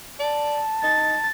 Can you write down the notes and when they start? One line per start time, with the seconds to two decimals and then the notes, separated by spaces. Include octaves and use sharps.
0.19 D5 A5
0.83 D#4 A6